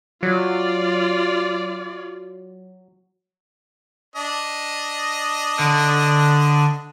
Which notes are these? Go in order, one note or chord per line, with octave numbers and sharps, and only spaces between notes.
F#3 F4 D5
D4 D#5
D3